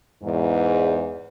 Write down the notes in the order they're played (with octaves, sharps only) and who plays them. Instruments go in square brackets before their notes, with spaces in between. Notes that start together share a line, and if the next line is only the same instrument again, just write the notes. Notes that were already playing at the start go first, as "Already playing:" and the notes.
[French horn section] E2 G#2